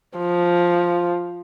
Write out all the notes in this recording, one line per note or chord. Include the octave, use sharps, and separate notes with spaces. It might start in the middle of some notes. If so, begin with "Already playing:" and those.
F3